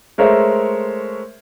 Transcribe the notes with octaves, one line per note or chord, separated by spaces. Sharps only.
G#3 A3 A#4 C5 C#5 E5